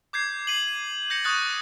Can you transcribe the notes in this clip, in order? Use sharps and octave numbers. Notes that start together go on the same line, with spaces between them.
D6 G6 G#6 C7
C7 D#7 F#7
G6 A#6 C#7
C#6 D#6 F#6 A6